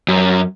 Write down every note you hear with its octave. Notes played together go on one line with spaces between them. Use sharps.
F#2